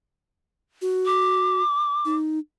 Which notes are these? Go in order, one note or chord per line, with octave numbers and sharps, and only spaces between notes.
F#4
D6
D#4